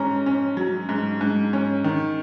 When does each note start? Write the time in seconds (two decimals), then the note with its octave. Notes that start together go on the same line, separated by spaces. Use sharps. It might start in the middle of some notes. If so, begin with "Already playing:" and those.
Already playing: G#2 C#4 A#5
0.26 C#4
0.57 F#3
0.89 G#2
1.21 G#2
1.53 C#4
1.84 D#3